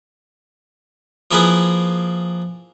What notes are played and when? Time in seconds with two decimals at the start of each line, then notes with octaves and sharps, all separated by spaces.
1.31 F3 A#3 E4 G#4 A#4 B4